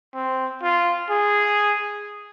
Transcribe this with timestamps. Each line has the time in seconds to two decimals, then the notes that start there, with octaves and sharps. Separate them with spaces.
0.14 C4
0.62 F4
1.10 G#4